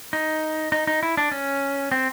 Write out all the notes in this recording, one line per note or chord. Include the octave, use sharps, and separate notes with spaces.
D#4
D#4
D#4
E4
D4
C#4
C4